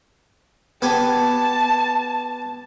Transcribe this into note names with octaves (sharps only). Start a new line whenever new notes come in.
B3 G4 G#5 A5